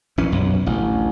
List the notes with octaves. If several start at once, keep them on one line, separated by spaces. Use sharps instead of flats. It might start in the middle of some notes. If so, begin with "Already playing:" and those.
A#1 E3 C#4
B1 F#2
A1 D2